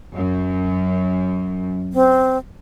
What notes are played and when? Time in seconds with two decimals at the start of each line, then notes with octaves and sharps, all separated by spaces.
0.15 F#2
1.93 C4